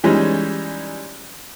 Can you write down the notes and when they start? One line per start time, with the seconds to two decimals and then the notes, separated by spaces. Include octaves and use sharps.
0.04 E3 G3 G#3 C#4 D#4